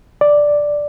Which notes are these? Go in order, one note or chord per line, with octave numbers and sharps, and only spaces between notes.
D5